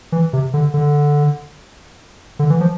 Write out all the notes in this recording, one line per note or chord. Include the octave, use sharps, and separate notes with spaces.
E3
C3
D3
D3
D3
E3
F3